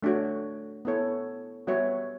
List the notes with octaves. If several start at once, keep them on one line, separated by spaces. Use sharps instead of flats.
A3 D4 F#4 C#5
B3 E4 A4 C#5
G3 B3 F#4 C#5 E5